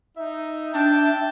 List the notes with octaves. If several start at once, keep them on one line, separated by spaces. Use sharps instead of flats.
D#4 E5
D4 G5 A5